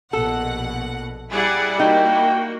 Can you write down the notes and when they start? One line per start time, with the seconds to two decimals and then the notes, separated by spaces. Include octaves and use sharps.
0.13 A#1 B2 A4 F#5
1.31 G3 E4 G#4 D5 F#5
1.79 A#3 D#4 F#4 G5